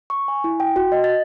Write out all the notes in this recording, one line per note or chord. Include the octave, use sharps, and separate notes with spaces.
C#6
G#5
E4
G5
F#4
D#5
A6